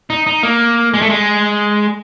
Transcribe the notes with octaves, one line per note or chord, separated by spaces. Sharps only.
D#4
D#4
A#3
G#3
A3
G#3